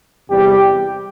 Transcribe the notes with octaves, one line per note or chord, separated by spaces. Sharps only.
E2 C3 G3 G4